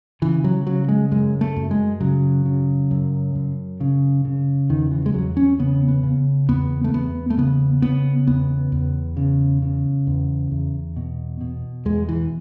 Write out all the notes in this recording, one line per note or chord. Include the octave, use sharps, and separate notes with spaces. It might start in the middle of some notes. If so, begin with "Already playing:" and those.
C#3 E3
F#3
C#3 F#3
G#3
F#2 G#3
A3
F#2
G#3
C#3 F#3
C#3
F#2
F#2
C#3
C#3
E2 D#3
E3
G#3
E2 F#3
C#4
C#3 B3
B3
C#3
E2 B3
A3
E2 B3
A3
C#3 B3
C#3 B3
E2 B3
E2
C#3
C#3
E2
E2
B2
B2
E2 G#3
E3